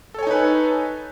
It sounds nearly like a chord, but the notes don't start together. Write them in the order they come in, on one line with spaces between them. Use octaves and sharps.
A4 C#5 G#5 D#4 B4